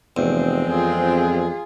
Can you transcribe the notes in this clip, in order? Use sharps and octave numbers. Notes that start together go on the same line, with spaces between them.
F1 E2 G#3 C4
F2 F4 G#4